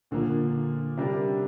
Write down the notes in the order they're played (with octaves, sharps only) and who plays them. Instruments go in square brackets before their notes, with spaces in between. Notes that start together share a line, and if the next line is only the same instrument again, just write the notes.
[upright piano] A#2 F3 A#3 [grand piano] D3
[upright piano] C3 G3 D4 A#4